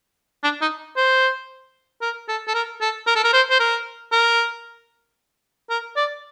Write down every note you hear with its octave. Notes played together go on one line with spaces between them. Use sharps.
D4
D#4
C5
A#4
A4
A4
A#4
A4
A#4
A4
A#4
C5
C5
A#4
A#4
A#4
D5